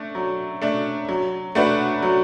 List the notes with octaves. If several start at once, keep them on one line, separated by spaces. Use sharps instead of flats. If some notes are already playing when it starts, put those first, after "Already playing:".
Already playing: A3 D4
F#3
A3 D4
F#3
A3 D4 F#4 B4
F#3